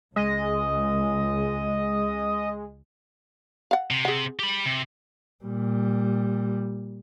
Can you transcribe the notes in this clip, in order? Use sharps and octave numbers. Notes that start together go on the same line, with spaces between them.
C#2 G#3 D#5
F5 F#5
C3
G#4 F#5
G4 B5
C3
A#2 G3